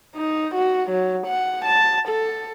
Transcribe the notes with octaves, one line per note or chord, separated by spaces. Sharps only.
D#4
F#4
F#3
F#5
A5
A4